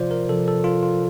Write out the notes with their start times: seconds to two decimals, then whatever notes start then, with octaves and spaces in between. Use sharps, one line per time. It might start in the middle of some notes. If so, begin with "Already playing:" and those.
Already playing: C3 F3 F4 C5 D5
0.11 A#4
0.29 C3 F3 A4
0.48 A4
0.64 F4
0.83 F4